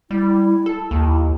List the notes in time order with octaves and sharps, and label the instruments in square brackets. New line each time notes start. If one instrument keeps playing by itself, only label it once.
[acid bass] G3 [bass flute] E4
[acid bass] A4
[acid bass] D#2 [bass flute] E4